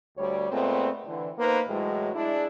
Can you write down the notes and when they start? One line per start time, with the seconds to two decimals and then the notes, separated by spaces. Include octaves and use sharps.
0.18 D2 G3 C#5
0.52 A#2 G#3 A3 B3 C4
1.06 D3 E3
1.39 A#3 B3 D#4 B4 C5
1.68 A2 E3 F#3 G#3
2.15 D4 E4 G#4